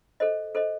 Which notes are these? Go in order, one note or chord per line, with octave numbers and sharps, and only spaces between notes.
A4 C5 D#5
A4 C5 D#5